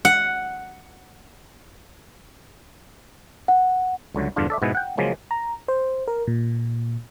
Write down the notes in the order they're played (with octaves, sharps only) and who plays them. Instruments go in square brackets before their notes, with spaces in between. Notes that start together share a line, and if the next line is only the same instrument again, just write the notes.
[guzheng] F#5
[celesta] F#5
[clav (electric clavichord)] C#2 D3 F#3 A3
E2 G2 D3 D4 F4
A4 D5 E5
G#2 B2 B3 E4 G#5
F#5 G5
C#3 F3 F#3 G#3 A#3
[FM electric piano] A#5
C5
A#4
A#2